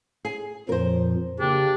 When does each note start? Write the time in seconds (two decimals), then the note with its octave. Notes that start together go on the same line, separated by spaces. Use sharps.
0.25 G#4
0.69 F2 A#2 F3 A#4 C5
1.40 C#3 A#3 D4 G4